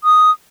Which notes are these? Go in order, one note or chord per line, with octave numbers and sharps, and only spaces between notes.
D#6